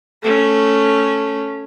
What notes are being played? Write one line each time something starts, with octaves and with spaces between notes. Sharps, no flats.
A3 C#4